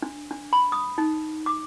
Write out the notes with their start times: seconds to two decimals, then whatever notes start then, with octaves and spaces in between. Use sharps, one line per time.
0.02 D4
0.31 D4
0.53 B5
0.72 D#6
0.98 D#4
1.46 D6